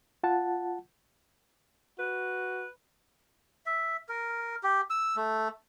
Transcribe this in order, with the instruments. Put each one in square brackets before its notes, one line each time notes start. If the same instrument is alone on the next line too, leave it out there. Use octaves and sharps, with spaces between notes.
[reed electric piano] F4 F#5 A5
[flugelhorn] F#4 [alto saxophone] B4
[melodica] E5
A#4
G4
E6
A3